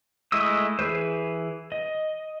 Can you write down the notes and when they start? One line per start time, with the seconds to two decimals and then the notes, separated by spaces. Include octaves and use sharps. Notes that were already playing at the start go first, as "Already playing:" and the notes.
0.32 G#3 A3 E4 D#5 E6
0.79 E3 G#4 B4 C5
1.72 D#5